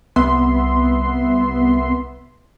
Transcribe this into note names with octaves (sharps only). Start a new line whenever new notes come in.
C2 B3 E5 C6